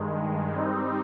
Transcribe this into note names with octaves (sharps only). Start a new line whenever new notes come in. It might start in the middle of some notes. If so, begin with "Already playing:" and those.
Already playing: G2 D#3 G#3
G3 C4 D#4